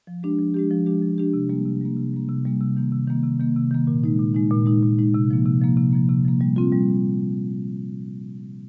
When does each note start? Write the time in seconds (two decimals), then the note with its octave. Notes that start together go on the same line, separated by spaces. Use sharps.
0.07 F3
0.23 G#3 D4 G4
0.39 F3
0.54 G#3 D4 G4
0.71 F3
0.86 G#3 D4 G4
1.02 F3
1.18 G#3 D4 G4
1.34 C3
1.49 G3 A#3
1.66 C3
1.81 G3 A#3
1.97 C3
2.14 G3 A#3
2.29 C3
2.45 G3 A#3
2.61 C3
2.77 D#3 A#3
2.92 C3
3.08 D#3 A#3
3.24 C3
3.39 D#3 A#3
3.56 C3
3.71 D#3 A#3
3.87 A#2
4.04 G#3 D#4
4.19 A#2
4.35 G#3 D#4
4.51 A#2
4.66 G#3 D#4
4.83 A#2
4.99 G#3 D#4
5.14 C3
5.31 F3 A#3
5.46 C3
5.61 F3 A#3
5.77 C3
5.93 F3 A#3
6.09 C3
6.25 F3 A#3
6.41 G3
6.56 C4 F4
6.72 G3